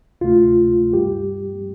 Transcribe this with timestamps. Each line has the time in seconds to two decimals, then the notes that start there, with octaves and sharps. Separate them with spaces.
0.21 D2 C3 A3 F4
0.93 G2 G3 G4